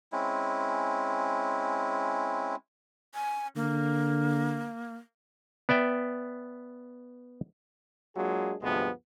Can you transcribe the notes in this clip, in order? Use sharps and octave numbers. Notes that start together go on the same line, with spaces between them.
G#3 C4 C#4 E4
G#5
D3 A#3
B3 D5 E5 G5
F#3 G#3 A#3 D4 F4 G#4
D2 G2 C3 F3 G#3 B3